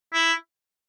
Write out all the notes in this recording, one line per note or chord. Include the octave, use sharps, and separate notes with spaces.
E4